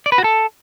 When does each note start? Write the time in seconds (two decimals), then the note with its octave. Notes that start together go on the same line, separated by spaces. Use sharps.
0.06 D5
0.12 B4
0.18 F#4
0.24 A4